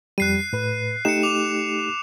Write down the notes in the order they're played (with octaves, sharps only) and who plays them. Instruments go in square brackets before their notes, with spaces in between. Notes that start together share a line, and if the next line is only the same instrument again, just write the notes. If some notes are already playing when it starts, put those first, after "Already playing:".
[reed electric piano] F2 G3 [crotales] F#6 C7 D#7
[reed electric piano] A2 B4
[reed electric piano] A3 D#4 G4 [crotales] C#7 E7
[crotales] D6 F7